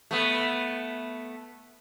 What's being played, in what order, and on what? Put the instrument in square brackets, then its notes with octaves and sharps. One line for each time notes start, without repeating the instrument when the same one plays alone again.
[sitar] A3 B3